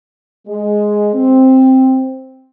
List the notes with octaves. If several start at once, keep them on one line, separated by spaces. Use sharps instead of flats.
G#3
C4